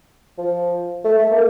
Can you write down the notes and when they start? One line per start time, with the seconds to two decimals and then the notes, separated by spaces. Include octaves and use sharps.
0.38 F3
1.05 A3
1.18 A3
1.31 A#3